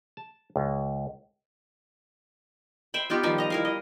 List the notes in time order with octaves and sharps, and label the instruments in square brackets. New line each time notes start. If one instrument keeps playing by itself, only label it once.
[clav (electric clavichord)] A5
C#2
[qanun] C5 E5 G5 B5
B3 D#4 F4 G4
D#3 F3 G3 D#4
D#5 A#5
E4 A#4 F5
D#5